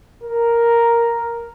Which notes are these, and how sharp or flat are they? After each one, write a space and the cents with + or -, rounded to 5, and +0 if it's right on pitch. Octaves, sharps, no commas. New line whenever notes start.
A#4 +0